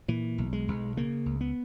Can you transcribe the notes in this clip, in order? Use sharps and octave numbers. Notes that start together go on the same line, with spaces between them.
A#2 E3
B1
G#3
B1
C#3 A#3
C#2
B3